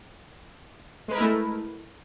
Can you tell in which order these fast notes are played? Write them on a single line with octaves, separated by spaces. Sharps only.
G#3 B4 A#4 E4 A3